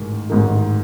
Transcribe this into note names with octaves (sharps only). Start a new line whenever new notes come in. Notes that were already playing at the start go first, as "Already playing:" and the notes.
Already playing: A1 G#2 D#3
A1 G#2 D#3